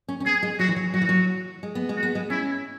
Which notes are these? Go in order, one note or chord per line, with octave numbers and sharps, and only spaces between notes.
C#4
C#4
B3 G#4
G#3
F#3 F#4
E3
F#3
F#3 F#4
E3
F#3
G#3
B3
G#3
F#4
B3
G#3
C#4 E4